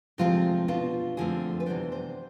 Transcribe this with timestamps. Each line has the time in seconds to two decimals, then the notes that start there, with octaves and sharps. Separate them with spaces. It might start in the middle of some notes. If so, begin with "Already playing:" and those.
0.18 D2 C3 F3 G#3 C4 F4
0.68 B2 B3 D4 F4
1.17 F2 D3 F3 A3 C4 G#4
1.60 B4
1.66 C3 E3 B3 D4 C5
1.92 C5